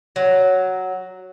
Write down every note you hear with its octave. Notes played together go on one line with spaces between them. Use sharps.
F#3